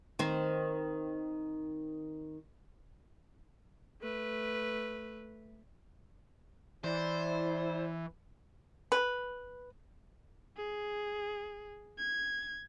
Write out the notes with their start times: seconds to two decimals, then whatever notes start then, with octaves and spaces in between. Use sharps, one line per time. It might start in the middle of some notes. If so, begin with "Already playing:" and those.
0.19 D#3 C4
4.01 A3 B4
6.84 E3 E4 C5 D5
8.92 B4
10.57 G#4
11.99 G#6